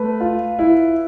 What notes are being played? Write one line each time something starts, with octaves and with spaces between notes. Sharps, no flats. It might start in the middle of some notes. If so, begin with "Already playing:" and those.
Already playing: A3 B4
F4
E4